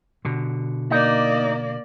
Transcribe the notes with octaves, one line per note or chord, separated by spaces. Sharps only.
B2 D3
A#3 D#4 D5